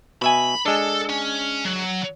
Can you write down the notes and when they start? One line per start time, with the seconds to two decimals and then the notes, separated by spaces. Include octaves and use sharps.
0.22 B2 E5 G#5 B5
0.66 G#3 D4 A4
1.09 C#4
1.65 F#3